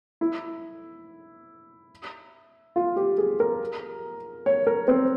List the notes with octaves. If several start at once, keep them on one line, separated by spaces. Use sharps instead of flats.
E4
F4
G4
G#4
A#4
C#5
A#4
C4